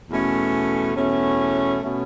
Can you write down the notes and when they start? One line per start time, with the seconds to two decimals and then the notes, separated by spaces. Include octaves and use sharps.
0.09 E2 B2 A3 C#4
0.95 E2 B2 A3 C#4
1.82 B2 A3 C#4